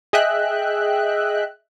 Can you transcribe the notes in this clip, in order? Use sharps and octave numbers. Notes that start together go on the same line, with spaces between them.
G#4 D#5 E5 G5 F#6